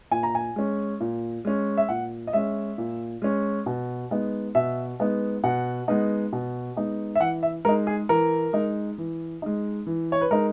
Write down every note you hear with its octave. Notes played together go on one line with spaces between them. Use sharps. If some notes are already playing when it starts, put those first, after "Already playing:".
A#2 G#5
A#5
G#5
G#3 C#4
A#2
G#3 C#4
E5
A#2 F#5
D#5
G#3 C#4 E5
A#2
G#3 C#4
B2
G#3 B3 D#4
B2 E5
G#3 B3 D#4
B2 F#5
G#3 B3 D#4
B2
G#3 B3 D#4
E5
E3 F#5
E5
G#3 D#4 A#4
G#4
E3 A#4
G#3 D#4
E3
G#3 D#4
E3
C#5
B4
G#3 D#4 A#4